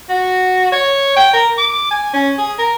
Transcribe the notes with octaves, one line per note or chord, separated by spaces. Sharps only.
F#4
C#5
G5
A#4
D6
G#5
C#4
G#4
A#4